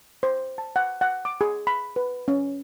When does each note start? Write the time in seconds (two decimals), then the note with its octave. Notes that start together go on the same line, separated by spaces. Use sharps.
0.23 C5
0.58 A5
0.76 F#5
1.01 F#5
1.25 D6
1.41 G#4
1.67 B5
1.96 B4
2.28 C#4